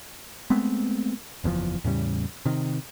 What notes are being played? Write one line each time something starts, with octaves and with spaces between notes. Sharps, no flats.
G#3 A3 B3 C4
F#1 E2 C3 F3
E2 A2 C#3 G3
C3 D#3